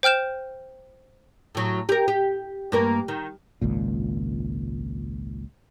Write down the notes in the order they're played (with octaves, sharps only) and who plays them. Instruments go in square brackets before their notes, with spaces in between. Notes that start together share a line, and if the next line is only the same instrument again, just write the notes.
[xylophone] C5 G5 F6 G6 E7
[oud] A2 F#3
G4 A#4
G4
G2 A#3 A#4
D#3
[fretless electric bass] G#1 C#2 A#2